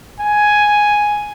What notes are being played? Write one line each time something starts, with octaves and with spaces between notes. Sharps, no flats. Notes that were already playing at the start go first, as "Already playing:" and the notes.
G#5